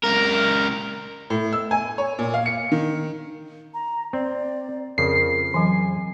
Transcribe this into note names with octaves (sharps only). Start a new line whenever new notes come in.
C#2 A#4
A2
E6
G#5
C#5
A#2
F5
C#7
D#3
A#5
C4 D5
F2 C#3 F3 A#4 C7
E3 F#3 G#5